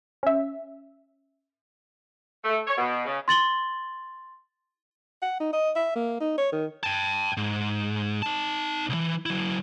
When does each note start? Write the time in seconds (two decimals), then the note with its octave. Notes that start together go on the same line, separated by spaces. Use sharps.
0.23 C#4 E5
2.45 A3
2.66 C#5
2.78 B2
3.06 C#3
3.28 C6 A6 F#7 G7
5.22 F#5
5.40 D#4
5.53 D#5
5.76 E5
5.95 A#3
6.20 D#4
6.38 C#5
6.52 D#3
6.83 G5 A5
7.37 G#2
8.22 D#4 A5
8.89 C2 E3
9.26 F#3 E4